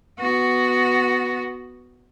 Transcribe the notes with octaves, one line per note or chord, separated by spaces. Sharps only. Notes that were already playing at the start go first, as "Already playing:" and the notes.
B3 F#4